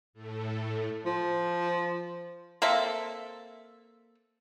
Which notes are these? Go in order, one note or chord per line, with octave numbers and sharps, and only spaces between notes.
A2 A3
F3
A#3 C4 A4 E5